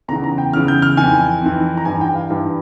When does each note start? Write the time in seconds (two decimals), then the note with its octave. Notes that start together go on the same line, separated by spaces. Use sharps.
0.08 E2 C#3 E3 A#5
0.24 A#5
0.38 G5
0.53 E2 C#3 E3 F6
0.68 G6
0.82 F6
0.97 F2 E3 G#5
1.41 F2 E3
1.77 A#5
1.85 G2 E3 G#5
2.01 G5
2.15 F5
2.30 G2 E3